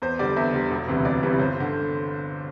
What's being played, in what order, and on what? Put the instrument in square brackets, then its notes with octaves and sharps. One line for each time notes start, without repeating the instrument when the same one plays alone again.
[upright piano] E2 C5
D3 G3 D5
E2 E5
D3 G3
E1
D2 C3 E3 G3
E1 D5
D2 C3 E3 G3
G1 C5
D3